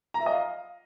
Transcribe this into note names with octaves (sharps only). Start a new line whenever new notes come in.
A#5
E5
D#5
F5